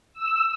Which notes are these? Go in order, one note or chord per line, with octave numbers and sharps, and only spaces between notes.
E6